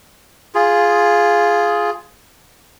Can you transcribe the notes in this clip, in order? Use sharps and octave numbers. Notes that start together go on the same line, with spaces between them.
F4 G#4